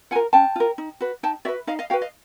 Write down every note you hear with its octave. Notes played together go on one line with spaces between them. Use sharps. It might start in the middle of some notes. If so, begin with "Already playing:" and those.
F4 A#4 F#5 G#5
C#4 G5 A5
F4 A#4
D#4
F#4 B4
D#4 G5 A5
F#4 B4 D5 E5
D#4 D#5 F5
D#5 F5
F#4 B4 F5 G5
D#5 F5